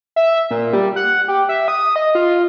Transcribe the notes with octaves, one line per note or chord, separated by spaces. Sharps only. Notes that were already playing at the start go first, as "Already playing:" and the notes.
E5
A#2
G3
F#5
G4
E5
D#6
D#5
F4